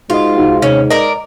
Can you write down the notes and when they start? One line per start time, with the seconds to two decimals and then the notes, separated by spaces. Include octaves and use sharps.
0.10 G#2 F4 F#4 D#5
0.37 C2 D#4 F#4
0.62 D#2 C3 C#4
0.91 A#4 D5 D#5